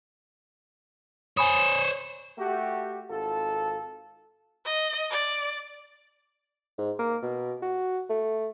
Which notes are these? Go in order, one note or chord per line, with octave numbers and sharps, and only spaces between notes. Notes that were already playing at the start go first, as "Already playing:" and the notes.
C5 C#5 G#5 B5 D#6 E7
A3 F#4 G4
G#1 F4 A4
D#5
D5
G#2
A#3
B2
F#4
A3